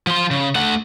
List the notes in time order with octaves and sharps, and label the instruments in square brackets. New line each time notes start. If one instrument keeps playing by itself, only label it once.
[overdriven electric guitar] F3 C6
C#3
A3 F#5